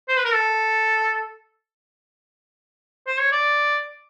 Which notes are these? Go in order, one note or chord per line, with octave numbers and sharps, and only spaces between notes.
C5
B4
A#4
A4
C5
C#5
D5